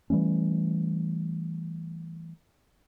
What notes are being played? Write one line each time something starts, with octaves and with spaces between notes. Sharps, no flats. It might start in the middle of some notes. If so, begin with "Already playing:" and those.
E3 G3 A3 C#4